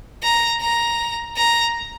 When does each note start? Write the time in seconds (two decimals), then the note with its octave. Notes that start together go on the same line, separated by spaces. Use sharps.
0.23 A#5
0.61 A#5
1.37 A#5